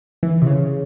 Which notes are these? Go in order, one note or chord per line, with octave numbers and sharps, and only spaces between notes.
E3
C3
C#3